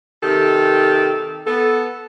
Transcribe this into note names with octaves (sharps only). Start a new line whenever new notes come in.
C3 D#3 G4 A4
B3 A4